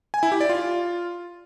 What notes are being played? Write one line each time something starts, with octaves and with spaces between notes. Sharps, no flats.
G#5
E4
G4
D5
F4